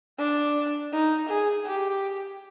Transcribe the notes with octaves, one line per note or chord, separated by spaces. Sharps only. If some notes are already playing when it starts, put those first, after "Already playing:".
D4
D#4
G#4
G4